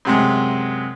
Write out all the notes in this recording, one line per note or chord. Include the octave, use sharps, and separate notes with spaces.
F#2 C3 G#3